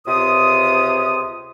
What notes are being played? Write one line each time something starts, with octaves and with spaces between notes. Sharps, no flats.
C#2 C3 F4 D#6